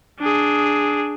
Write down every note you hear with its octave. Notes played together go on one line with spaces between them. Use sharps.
D4 G#4